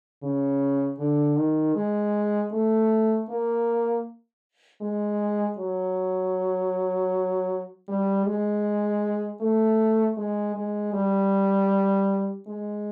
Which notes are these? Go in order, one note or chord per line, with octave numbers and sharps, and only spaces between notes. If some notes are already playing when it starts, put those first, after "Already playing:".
C#3
D3
D#3
G#3
A3
A#3
G#3
F#3
G3
G#3
A3
G#3
G#3
G3
G#3